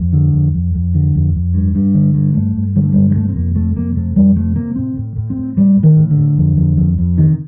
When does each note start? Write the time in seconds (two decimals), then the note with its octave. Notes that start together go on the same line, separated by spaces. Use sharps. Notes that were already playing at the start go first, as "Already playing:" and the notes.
Already playing: F2
0.13 D3
0.33 F2
0.54 F2
0.74 F2
0.94 D3
1.15 F2
1.35 F2
1.54 G2
1.75 G2
1.94 D3
2.14 G2
2.34 G2 A3
2.55 G2
2.76 D3 G3
2.83 A3
2.92 G2 G3
3.10 G3
3.15 C3 A3
3.29 C4
3.35 F2 A#3
3.56 C3 A3
3.76 F2 A#3
3.96 C3 A3
4.16 F2 G3
4.36 C3 A3
4.56 C3 A#3
4.76 A2 C4
4.97 A2
5.16 A2
5.30 C4
5.37 A2
5.57 A2 G3
5.77 A2
5.83 D#3
5.97 A2
6.10 D3
6.17 A2
6.37 F2
6.57 F2
6.77 F2
6.98 F2
7.17 C3 D#3